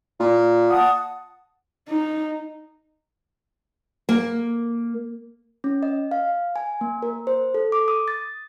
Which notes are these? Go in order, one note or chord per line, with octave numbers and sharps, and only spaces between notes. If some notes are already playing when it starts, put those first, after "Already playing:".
A#2
F#5 A5 D#6
D#4
A#3
C#4
D#5
F5
G#5
A#3
A#4
C5
A4
D6
D#6
A6